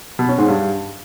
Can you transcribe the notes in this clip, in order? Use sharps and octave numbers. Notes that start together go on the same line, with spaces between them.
B2
C#4
G#2
G2